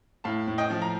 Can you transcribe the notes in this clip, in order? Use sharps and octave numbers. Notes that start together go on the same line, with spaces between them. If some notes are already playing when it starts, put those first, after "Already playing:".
A2 F5 A5
A2
D#5 G5
F3
A#5